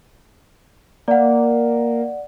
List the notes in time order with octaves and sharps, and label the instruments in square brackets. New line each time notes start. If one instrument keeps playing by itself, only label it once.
[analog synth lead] A#3 [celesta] D5 F#5